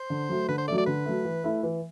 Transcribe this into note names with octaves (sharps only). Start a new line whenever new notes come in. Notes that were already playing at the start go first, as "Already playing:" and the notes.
Already playing: C5
D3
F#3 A3
D3 B4
C5
F#3 A3 D5
D5
D3 B4
F#3 A3
E3
A3 E4
E3